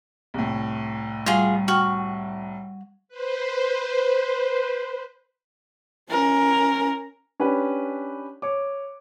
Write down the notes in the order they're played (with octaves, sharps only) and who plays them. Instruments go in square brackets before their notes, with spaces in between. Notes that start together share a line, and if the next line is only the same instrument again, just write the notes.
[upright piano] C2 A2
[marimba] G3 [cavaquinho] F4 F#4 G#4
[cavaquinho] F#4 [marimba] G5 C#6 F6
[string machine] B4 C5
[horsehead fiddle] C#4 A#4
[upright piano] C#4 D4 G4 B4
C#5 D6